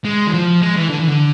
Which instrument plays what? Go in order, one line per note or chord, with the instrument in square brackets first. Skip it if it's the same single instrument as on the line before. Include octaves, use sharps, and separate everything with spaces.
[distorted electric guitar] G#3
E3
F3
G#3
E3
D3
E3
D3